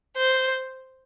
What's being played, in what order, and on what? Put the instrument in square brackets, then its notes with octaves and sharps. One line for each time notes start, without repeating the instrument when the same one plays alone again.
[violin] C5